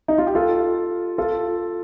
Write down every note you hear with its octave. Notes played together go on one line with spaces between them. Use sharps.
D#4
F4
G4
F4 A4
F4 A4